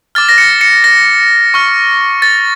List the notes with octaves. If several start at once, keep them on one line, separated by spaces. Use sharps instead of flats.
D6 F6 A6
A#6
C#7
C#7
A#6
C#6 F6
A6